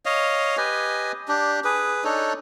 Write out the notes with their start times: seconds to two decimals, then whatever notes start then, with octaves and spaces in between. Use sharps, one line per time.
0.06 C#5 D#5 F5
0.57 G4 B4 D#5 G#5
1.28 D4 G4
1.64 G#4 B4
2.04 D4 D#4 A4 C#5